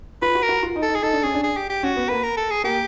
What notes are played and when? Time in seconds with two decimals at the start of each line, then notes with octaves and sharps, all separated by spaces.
0.22 F4 B4
0.35 F#4
0.42 A#4
0.49 F#4
0.63 F4
0.76 D#4
0.82 A4
0.89 D#4
0.95 G#4
1.03 D#4 A4
1.13 D4
1.23 C#4 G#4
1.34 D4
1.43 G#4
1.57 G4
1.70 G4
1.83 C#4 F#4
1.97 B3
2.09 A#3 B4
2.23 A#4
2.37 A4
2.50 G#4
2.64 A#3 G4